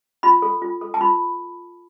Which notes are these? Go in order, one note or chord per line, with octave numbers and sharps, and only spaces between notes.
F4 B5
A4
F4
A4
A5
F4 B5